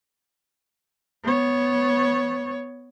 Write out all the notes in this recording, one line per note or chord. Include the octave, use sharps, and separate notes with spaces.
B3 C#5